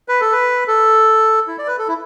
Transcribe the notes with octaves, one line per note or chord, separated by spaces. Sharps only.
B4
A4
B4
A4
E4
D5
B4
A4
E4